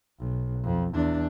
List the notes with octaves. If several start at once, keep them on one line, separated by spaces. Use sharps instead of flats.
B1
F2
E2 D4